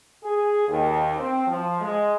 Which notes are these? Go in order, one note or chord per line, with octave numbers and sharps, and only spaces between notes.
G#4
D#2
C4
F3
G#3